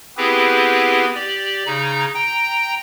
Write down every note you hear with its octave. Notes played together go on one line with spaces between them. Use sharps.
B3 C4 E4 G4 G#4 B4
G4 D5
C#3 D#4 A#5
G5 A#5